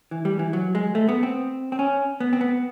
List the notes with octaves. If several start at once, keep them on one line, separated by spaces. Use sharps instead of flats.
E3
G3
E3
F#3
G#3
A3
B3
C4
C4
C#4
B3
C4
B3